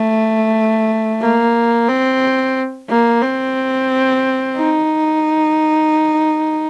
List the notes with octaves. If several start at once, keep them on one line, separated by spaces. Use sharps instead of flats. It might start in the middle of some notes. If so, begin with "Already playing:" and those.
Already playing: A3
A#3
C4
A#3
C4
D#4